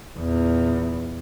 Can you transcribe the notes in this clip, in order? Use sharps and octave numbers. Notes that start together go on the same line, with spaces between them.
E2 A#2